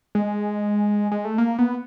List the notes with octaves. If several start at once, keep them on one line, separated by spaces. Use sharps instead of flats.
G#3
G#3
A3
A#3
B3